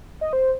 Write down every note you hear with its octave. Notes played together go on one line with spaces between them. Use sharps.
D#5
C5